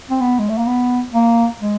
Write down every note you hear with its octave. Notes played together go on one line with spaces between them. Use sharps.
C4
B3
G#3
A3
A#3
B3
A#3
G#3